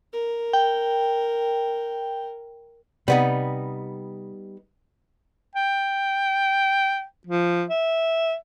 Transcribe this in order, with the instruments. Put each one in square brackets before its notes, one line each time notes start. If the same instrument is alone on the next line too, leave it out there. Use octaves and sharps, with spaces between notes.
[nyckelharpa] A#4
[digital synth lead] G5
[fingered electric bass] C3 [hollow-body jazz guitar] G3 B3 D#4
[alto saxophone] G5
F3
E5